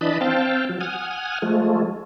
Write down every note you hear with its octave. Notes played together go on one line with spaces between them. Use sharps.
E3 D4 D#5 A5 B5
C4 F5 G5 A5
F3 F#3
F#5 G#5 D#6 F6
F3 G#3 A3